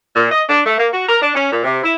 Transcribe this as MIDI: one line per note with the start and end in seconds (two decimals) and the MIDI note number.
0.16 0.27 46
0.30 0.43 75
0.49 0.61 62
0.66 0.74 57
0.78 0.88 58
0.93 1.05 66
1.08 1.18 70
1.22 1.33 62
1.35 1.51 61
1.52 1.64 46
1.64 1.79 48
1.84 1.95 64